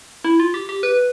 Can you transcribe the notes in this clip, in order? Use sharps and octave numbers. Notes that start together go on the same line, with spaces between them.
E4
F4
G4
G4
B4